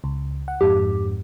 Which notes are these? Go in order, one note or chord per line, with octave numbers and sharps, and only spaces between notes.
C#2
F#5
F2 G#2 G4